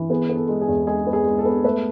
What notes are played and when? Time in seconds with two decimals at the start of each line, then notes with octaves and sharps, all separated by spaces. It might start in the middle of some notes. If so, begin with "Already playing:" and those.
Already playing: E3
0.10 B3 G#4
0.29 B3
0.35 A4
0.49 G#3
0.61 G#4
0.68 E2
0.87 G#3 G#4
1.07 B3
1.13 G#4
1.26 G#3
1.39 A4
1.45 B3
1.64 A3 B4